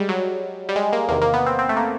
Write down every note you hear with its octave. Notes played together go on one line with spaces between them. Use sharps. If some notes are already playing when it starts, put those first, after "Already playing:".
Already playing: G3 G#3
F#3
G3
G#3
A#3
E2 C3 D#3 A#3
A#3
B3
C4
C4
A3
A#3